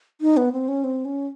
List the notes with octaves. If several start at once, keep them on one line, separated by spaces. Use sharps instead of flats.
D#4
B3
C4
C#4
C4
C#4